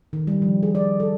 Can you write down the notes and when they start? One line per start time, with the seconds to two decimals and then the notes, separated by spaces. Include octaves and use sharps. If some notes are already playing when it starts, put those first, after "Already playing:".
0.13 D#3
0.27 G3
0.42 F3
0.63 G#4
0.75 D5
1.00 A4